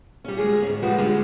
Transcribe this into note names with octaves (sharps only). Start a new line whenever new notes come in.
G3 C#4
D2 G#3 G#4
G#2 C#4
D2 F3 G3 G#3 F#4 B4
D3 G3 G#3 C#4